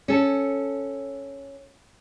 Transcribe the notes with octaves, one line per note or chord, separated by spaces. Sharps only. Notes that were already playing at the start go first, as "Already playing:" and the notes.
C#4 A4